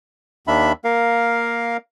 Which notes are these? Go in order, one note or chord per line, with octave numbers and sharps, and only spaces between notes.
D#2 D#3 D4 E5 B5
A#3 A#4 F5